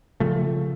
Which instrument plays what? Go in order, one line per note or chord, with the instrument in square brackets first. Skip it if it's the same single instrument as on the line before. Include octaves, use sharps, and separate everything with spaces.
[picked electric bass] C#3 F3 A3